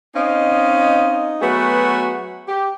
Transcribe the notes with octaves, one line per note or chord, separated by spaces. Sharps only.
C4 C#4 D#4 D#5 F5
F#3 A3 B3 F#4 G#4 B4
G4